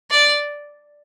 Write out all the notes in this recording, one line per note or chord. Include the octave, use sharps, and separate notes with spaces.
D5